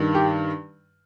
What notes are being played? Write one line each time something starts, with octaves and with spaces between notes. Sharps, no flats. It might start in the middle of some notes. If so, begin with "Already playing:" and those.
Already playing: G2 D#3
G4